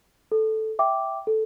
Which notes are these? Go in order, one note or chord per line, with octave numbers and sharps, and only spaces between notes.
A4
E5 G5 D6
A4